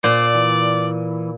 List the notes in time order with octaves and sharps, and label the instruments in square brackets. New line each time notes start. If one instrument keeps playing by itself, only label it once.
[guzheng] A#2 [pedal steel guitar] C5 [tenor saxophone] D5
[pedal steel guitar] E3